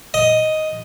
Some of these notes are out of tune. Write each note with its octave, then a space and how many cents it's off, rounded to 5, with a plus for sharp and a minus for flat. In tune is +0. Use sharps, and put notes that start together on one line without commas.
D#5 +5